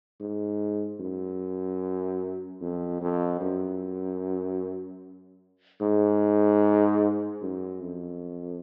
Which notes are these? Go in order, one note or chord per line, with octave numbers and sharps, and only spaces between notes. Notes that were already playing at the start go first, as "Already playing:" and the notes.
G#2
F#2
F2
F2
F#2
G#2
F#2
F2